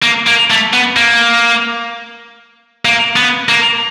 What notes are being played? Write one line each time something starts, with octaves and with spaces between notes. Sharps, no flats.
A#3
A#3
A3
B3
A#3
A#3
B3
A#3